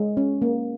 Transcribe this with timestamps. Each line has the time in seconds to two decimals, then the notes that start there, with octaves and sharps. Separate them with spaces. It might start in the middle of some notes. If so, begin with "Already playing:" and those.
Already playing: G#3
0.17 C#4
0.42 A#3